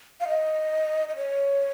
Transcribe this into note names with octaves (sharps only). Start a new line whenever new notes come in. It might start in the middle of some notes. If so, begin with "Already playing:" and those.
F5
D#5
D#5
C#5